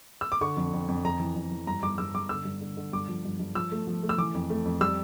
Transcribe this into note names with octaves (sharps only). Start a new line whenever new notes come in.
E6
D6
D3 C#6
F2
F2
F2
F2 A#5
E3
F2
E3
G2 A#5
G2 D6
G2 E6
G2 D6
D3 E6
G2
D3
D3
G2 D6
F3
G2
G2
F3 E6
A3
F3
A3
E6
E3 D6
F2
A3
F2
G3 E6